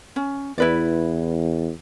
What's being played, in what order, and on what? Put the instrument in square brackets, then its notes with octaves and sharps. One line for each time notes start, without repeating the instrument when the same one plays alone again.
[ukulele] C#4
[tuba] E2 [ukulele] E4 B4 D5